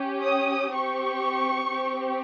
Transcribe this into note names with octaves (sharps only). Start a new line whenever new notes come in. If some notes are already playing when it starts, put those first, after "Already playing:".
Already playing: C#4 G4
D#6
C4 G4 C#6
C4 G4